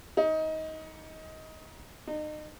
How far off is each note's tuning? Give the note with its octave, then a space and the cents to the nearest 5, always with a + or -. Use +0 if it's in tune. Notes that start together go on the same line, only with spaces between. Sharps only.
D#4 +20
D#4 -35